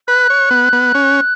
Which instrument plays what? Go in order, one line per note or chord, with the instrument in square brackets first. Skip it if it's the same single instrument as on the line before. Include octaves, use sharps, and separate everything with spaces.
[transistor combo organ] B4 [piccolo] F#6
[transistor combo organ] C#5
B3
B3
C#4